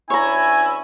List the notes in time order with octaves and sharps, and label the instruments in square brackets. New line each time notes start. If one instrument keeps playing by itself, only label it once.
[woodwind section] D2 C#4 E4 [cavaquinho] C#5 A#5 [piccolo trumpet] G#5